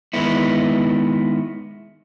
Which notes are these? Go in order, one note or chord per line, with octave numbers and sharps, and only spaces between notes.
D#3 G#3 B3 E4